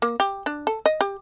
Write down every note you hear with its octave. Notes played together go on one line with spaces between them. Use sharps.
A#3
G4
D4
A4
D#5
G4